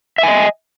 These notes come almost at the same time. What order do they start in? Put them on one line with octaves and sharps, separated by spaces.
E5 G#5 D#5